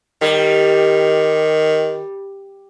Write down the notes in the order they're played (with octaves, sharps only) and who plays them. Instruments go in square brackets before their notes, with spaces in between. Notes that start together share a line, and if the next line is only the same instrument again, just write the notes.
[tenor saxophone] D#3 [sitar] G3